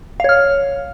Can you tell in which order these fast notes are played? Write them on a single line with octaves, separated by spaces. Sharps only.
F5 C#5 F6